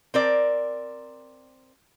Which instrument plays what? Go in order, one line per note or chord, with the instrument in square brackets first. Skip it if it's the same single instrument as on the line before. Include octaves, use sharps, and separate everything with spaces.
[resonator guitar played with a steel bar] C4 A#4 D5